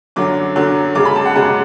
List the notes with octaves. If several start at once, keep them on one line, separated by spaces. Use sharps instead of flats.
F#2 D3 F#3 D6
F#2 D3 F#3
F#2 C#3 G#3 D6
B5
A5
F#5
F#2 C#3 G#3 F#5